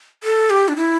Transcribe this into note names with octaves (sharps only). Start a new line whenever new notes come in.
A4
G4
D4
E4